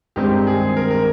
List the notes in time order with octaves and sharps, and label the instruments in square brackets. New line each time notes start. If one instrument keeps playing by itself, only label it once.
[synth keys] G2 D#3 G#3 C4 [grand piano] G4
[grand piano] G#4
A#4
A#4